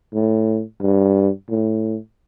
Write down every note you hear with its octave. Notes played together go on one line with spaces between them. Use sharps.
A2
G2
A2